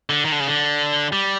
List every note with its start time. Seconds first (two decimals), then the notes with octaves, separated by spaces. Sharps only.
0.10 D3
0.24 D#3
0.32 D3
0.40 C#3
0.48 D3
1.13 G3